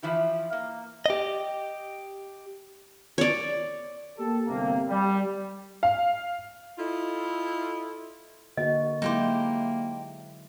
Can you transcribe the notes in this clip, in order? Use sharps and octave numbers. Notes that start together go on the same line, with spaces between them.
E3 F3 E4 G4
A#3
G4 D#5
C#5 D5
A#3 G4 A4
G1 C3 A#3
G3
F5
E4 F4 A4 D#5
D3 A#3 F#4 D#5
F#3 G#3 A#3 D#4 E4 G4 C5